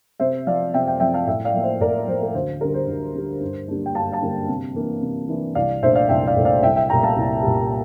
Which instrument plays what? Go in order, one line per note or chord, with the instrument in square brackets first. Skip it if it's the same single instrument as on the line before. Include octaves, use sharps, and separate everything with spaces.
[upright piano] C3 C5 E5
F3 C4 D5 F5
C3 E5 G5
E5 G5
F3 C4 E5 G5
F5 A5
A2 E5 G5
D5 F5
F3 A#3
C5 E5
A2 A#4 D5
D5
F3 A#3 C5
A#4
D2 C5
D3 G3 A#4
C5
D2
D3 G3
G2
D3 G3 A#3 D4
G5
G2 F5 A5
F5 A5
D3 G3 A#3 D4
C3
E3 A#3 D4
C3
E3 A#3 D4
C2 D5 F5
A#2 A3 D4 C5 E5
D5 F5
C2 E5 G5
D5 F5
A#2 A3 D4
D5 F5
C2 E5 G5
E5 G5
A#2 G3 G5 A#5
F5 A5
C2
A#2 G3